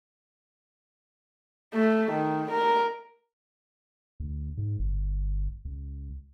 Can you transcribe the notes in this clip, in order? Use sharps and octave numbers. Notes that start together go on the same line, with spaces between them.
A3
D#3
A#4
D2
G#2
G1
C#2